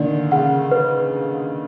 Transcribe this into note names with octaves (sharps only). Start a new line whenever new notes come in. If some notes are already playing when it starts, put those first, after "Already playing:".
Already playing: A#2 D3 D#3 D5
C#3 F#5
B4